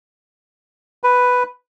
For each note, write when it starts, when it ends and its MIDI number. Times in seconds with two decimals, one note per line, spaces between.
1.04 1.43 71